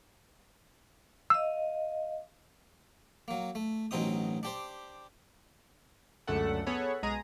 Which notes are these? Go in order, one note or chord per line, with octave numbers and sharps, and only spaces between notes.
D#5 F5 E6
F#3 A#3
A3
A1 B2 F#3 C4 D#4 D#6
D4 G4 C5
C#2 F#2 D3 A3 A4 F#5
B3 G#4 A4 C#5 F#5 B5
B1 G#3 G#4 A#5 D#6